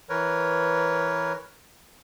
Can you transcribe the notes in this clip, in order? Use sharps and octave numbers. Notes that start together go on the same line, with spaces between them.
E3 A#4 B4 C#5